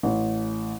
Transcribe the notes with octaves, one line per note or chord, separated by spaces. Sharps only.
A1